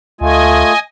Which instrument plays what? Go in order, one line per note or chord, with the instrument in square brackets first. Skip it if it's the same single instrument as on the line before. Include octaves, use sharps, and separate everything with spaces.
[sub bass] D2 [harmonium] A3 F4 [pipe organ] D#5 G#5